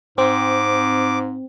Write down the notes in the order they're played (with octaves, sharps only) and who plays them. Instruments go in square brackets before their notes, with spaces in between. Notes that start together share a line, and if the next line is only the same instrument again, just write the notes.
[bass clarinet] G#2 [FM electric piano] C4 [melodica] D6